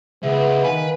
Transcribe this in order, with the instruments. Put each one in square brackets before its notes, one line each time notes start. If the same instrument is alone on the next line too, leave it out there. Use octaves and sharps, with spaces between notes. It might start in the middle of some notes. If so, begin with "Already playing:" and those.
[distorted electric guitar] C#2 [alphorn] B3 [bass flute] G#4 [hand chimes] E5
[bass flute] D#3 [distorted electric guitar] B4 [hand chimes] F5 G#5